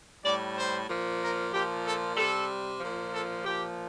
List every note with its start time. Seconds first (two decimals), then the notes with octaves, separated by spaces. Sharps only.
0.24 A2 G3 D5
0.56 C5
0.89 A#2 F3
1.21 A#4
1.52 A#2 F3 G4
1.85 A4
2.17 C3 G3 A4
2.80 A#2 F3
3.12 A4
3.45 A#2 F3 G4